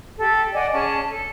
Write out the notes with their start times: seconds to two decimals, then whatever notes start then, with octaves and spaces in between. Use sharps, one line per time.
0.19 G4 A4
0.54 D5 D#5 F#5 G#5
0.73 C#4 G#4 D5 A5
1.08 A4